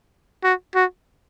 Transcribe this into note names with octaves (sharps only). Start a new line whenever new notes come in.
F#4
F#4